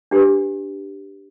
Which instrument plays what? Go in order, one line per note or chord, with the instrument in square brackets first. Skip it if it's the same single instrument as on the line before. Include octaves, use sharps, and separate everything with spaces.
[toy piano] D4 G4 B4